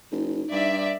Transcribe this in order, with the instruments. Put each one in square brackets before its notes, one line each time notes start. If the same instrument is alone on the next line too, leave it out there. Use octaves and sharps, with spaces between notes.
[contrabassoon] F#1 [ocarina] D#4
[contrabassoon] G2 [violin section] D5 E5